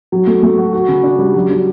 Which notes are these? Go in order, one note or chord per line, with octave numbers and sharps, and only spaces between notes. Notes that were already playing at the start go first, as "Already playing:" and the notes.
F#3
A3
A3
F#4
F#4
C#3
D4
G3
F#3
D4